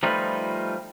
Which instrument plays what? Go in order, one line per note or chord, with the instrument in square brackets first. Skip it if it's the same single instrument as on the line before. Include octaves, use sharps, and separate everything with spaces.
[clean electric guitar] F3 G3 A3 D#4 F4 B4